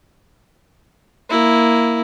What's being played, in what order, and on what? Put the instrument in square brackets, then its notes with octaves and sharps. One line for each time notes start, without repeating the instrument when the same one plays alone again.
[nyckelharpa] A#3 E4